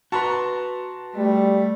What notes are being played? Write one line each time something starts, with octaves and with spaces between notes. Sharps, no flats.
F#4 B4 A5 A#5 C6
G3 A3